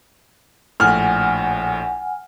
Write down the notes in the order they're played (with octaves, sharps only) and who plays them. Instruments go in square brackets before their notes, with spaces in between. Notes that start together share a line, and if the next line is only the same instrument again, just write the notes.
[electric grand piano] A#1 A2 [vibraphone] F#5 G#5 [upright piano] F6